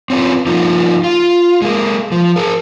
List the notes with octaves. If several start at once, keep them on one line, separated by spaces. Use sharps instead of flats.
C4 C#4 F4 B4
F3 A#3 D#4 F4
F4
G#3 A#3
F3
G#4 A#4